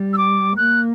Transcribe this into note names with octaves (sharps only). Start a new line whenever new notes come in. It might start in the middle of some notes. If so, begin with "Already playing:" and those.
Already playing: G3
E6
D6
A#3 F#6